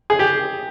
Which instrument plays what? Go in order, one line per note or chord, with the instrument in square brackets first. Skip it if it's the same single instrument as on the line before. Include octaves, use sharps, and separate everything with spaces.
[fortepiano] G#4
G4